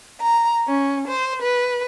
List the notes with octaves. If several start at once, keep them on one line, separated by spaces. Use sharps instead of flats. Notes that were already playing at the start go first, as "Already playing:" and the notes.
A#5
C#4
C5
B4